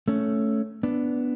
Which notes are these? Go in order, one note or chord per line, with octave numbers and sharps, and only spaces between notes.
A3 C#4
B3 D4